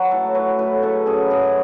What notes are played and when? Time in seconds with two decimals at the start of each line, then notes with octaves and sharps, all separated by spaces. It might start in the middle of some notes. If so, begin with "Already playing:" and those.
Already playing: F#3 B4
0.11 A2 A4
0.35 F#3 B4
0.59 A2 B4
0.83 C#3 A4
1.06 F#2 G#4
1.30 F#2 G#4